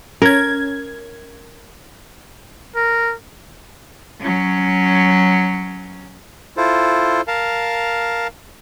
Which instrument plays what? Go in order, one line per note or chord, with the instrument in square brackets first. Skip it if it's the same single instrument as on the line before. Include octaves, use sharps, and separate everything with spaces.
[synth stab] C#4 G#6 [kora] A#4
[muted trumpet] A#4
[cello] F#3 C#4
[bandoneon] E4 F4 A4 C5
A#4 F5 A5